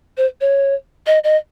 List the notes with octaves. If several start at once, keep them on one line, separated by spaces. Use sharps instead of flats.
C5
C#5
D#5
D#5